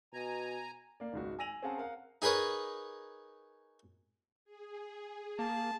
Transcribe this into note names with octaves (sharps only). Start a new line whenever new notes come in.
B2 G#5 A#5
A#3 D5
G#1 C#2 F#4
G#5 E6 A#6 D#7 F7 F#7
C4 C#4 G#4 F5 F#5 A5
A#4 F5 F#5
D#4 G#4 A#4 B4 C#5
G#4
A#3 A5